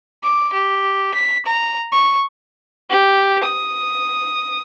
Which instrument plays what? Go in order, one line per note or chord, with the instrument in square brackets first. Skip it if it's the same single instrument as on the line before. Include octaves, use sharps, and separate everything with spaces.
[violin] D6
G4
B6
A#5
C#6
[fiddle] G4
D#6